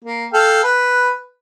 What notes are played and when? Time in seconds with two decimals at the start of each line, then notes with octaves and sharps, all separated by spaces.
0.04 A#3
0.33 A4 F5 G5
0.64 B4